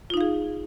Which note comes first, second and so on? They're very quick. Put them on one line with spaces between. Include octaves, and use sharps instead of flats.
F4 D#4 F5 G#4